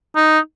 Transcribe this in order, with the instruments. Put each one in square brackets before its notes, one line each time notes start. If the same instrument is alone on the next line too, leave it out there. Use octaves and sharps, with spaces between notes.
[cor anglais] D#4